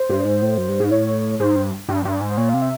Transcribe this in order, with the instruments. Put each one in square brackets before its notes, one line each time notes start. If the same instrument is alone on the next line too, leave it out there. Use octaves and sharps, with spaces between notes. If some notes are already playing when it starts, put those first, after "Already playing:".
Already playing: [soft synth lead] C5
[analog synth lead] G2
G#2
A2
F#2
G2
G#2
[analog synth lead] A2 [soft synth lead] C#5
[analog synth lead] G#2 [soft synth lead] C5
[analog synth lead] G2
G2
G2
G#2
[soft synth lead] C5
[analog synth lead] A#2 [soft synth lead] C#5
[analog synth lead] C3 [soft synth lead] F5
[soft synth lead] E5